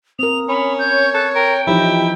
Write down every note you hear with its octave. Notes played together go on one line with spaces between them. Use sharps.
C4 A#4 D#6 F7
C#4 B5
C#5 G6
A4 F#6
A#4 G5
E3 F3 D#4 E4 G4